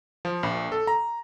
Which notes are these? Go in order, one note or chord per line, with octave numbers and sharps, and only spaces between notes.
F3
A#1
A4
A#5